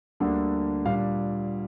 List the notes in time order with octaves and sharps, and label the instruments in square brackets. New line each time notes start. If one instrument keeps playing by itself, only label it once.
[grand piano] D2 D3 G3 A#3 D4
A#2 G3 D4 F5